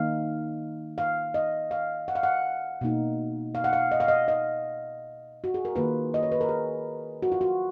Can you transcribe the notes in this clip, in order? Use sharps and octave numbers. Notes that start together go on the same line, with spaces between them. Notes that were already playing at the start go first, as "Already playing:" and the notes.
Already playing: D#3 A#3 D#4 F5
F5
D#5
F5
F#5
F5
F#5
B2 A#3 D#4
F5
F#5
F5
D#5
F5
D#5
D#5
F#4
G#4
A#4
D#3 A#3 F4 B4
D#5
C#5
B4
A#4
G#4
F#4
F4
F#4